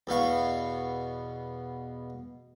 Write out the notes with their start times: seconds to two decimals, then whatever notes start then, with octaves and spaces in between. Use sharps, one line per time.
0.07 E2 B2 F5 C#6